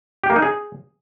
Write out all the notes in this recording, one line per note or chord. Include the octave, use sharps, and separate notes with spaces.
G4
A#3
D#4
G#4